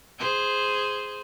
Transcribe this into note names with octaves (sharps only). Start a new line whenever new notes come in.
G#4 C5